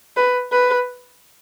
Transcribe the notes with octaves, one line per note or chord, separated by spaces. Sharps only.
B4
B4